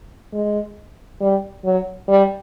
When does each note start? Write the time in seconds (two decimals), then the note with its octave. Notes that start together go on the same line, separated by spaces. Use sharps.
0.33 G#3
1.21 G3
1.65 F#3
2.08 G3